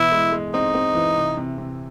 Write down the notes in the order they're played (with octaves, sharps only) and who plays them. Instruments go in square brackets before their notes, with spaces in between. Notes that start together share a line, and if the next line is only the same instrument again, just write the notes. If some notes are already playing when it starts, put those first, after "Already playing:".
Already playing: [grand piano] B2 E3 [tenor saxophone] E4
[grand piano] G#3
G#3
[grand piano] C4 [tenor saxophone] D#4
[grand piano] C4
E3
C3
C3
C3